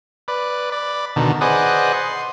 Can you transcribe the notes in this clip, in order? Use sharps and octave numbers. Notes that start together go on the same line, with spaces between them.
B4 D5
D5 B5
B2 D3 D#3
G#4 B4 C5 D5 D#5 F#5
C6